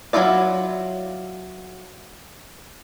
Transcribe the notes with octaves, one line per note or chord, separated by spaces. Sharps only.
F#3 C#4 E4 F4 D5